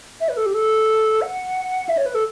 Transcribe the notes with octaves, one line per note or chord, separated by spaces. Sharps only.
E5
B4
A4
G4
A4
F#5
E5
C#5
B4
A4